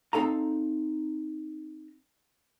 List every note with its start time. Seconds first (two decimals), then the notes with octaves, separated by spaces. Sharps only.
0.13 C4 D#4 A4 F5 A#5